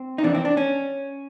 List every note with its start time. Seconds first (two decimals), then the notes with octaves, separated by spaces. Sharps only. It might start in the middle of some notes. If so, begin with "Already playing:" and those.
Already playing: C4
0.18 D#4
0.23 F2 C3 E3 D4
0.35 C4
0.45 D4
0.57 C#4